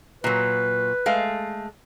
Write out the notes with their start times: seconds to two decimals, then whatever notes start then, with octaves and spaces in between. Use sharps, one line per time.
0.24 A#2 F#3 B4
1.06 G#3 A3 F5